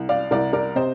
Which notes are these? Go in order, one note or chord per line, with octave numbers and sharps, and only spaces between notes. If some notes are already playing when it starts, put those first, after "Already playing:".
Already playing: C2
D5 F5
C2 A#4 D5
A#4 D5
C3 C5 D#5